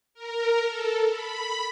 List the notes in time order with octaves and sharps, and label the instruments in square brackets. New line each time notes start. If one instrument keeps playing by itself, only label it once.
[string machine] A#4
A4
B5